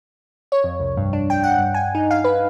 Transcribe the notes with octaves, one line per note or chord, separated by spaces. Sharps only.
C#5
F2
C2
G2
D4
G5
F#5
G2
G#5
D#4
F5
B4